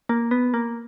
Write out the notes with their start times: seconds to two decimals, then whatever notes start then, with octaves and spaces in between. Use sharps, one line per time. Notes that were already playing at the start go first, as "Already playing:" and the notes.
0.09 A#3
0.31 B3
0.54 A#3